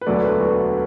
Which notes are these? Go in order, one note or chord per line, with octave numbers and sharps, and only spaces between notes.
B4
E1 D2 D3 F#3 A3 D5
B4
F#4